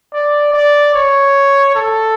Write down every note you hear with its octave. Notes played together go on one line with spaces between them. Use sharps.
D5
D5
C#5
A4